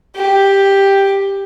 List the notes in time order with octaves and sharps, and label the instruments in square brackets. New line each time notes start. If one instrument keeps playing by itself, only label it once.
[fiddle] G4